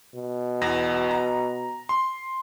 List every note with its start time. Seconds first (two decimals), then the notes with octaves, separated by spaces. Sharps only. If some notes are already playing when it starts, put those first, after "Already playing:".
0.15 B2
0.62 E2 A#6
1.11 A#5
1.89 C6